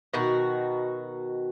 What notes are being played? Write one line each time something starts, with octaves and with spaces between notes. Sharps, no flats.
B2 D#3 F#4